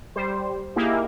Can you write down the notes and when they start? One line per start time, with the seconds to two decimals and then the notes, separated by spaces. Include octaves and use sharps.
0.16 G3 C5
0.76 A#3 D#4 E4 G4 G#4